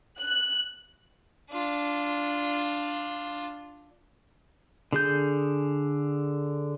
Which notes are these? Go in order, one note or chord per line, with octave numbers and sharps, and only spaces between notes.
F#6
D4 F4
D3 G#4 G6